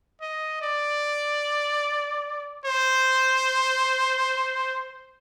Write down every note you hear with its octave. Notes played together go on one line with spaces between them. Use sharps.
D#5
D5
C5